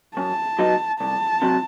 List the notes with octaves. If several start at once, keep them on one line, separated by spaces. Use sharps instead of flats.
F#2 A5
F#3 B3 D#4
C2 A5
C3 F#3